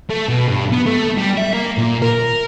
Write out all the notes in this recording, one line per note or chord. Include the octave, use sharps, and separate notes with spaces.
A3
B2
G2
B3
A3
G3
E5
A#3
A#2
A#4